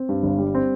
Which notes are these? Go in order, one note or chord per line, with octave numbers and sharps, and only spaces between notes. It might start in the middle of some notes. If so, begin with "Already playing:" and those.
Already playing: C4
G2
G1
G3
C4